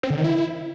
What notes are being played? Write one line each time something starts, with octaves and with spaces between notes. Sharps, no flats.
C4
D3
D#3
E4